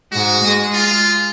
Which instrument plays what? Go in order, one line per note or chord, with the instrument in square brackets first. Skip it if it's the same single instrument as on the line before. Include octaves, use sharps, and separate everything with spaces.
[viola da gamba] G#2 [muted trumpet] F#4
[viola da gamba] G#3
[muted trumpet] F4